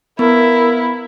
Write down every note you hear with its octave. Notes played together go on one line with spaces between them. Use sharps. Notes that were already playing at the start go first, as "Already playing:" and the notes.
B3 E4 A#4